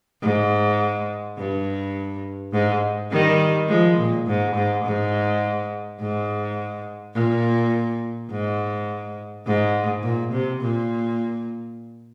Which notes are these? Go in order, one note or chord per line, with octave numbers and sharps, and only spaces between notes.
G#2
G2
G#2
D#3 G3
F3 G#3
A#2
G#2
G#2
G#2
G#2
A#2
G#2
G#2
A#2
C3
A#2